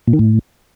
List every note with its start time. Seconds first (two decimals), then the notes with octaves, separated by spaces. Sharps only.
0.07 A#2
0.13 D#3
0.19 A2